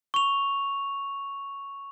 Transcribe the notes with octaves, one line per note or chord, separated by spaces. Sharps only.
C#6 F7